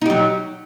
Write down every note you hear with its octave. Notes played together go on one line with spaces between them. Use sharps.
F#3 D#4 G4